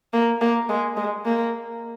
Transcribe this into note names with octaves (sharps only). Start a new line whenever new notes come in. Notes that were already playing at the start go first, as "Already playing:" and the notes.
A#3
A#3
G#3
G#3
A#3